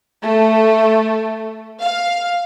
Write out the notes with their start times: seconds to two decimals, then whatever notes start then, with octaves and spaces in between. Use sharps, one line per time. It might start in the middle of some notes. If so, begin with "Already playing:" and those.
0.22 A3
1.82 F5